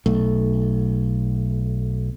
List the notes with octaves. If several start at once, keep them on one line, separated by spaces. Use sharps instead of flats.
B1 A3